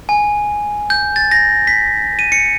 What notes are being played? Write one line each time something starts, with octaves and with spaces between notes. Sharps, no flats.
G#5
G6
A6
A#6
B6
D#7
C#7